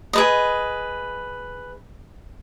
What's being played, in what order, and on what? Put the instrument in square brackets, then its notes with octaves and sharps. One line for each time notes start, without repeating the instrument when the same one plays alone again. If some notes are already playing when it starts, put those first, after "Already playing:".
[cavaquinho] G#4 B4 D#5